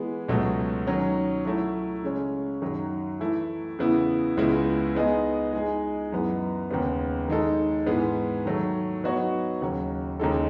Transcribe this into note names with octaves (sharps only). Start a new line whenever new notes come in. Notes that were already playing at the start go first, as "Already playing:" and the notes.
Already playing: E3 G#3 B3
C#2 B2 F#3 A3
D#3 F#3 C#4
F#3 A3 E4
C#3 G#3 C#4
F#2 D#3 F#3
E3 A3 E4
E2 C#3 E3 B3 E4
C#2 C#3 G#3 B3 E4
G#3 B3 D#4 G#4 D#5
G#3 D#4 G#4 D#5
F#2 E3 B3
D#2 C#3 G#3 B3
D#3 G#3 D#4 A4
G#2 E3 G#3 B3
D#3 F#3 A3
F#3 B3 D#4 F#4 C#5
D#2 C#3 F#3
D#2 C#3 G#3 D#4 A4